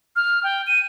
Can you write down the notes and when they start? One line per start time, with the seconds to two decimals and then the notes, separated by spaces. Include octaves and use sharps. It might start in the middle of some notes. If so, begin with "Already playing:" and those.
0.16 F6
0.44 G5
0.67 D#7